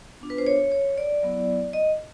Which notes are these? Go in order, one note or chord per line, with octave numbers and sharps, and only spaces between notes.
B3 D4 F4
B4
C5
C#5
C#5
D5
F#3 B3 E4
D#5